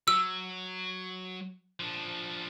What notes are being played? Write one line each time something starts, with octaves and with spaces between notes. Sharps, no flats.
F#3 E6
F3 D4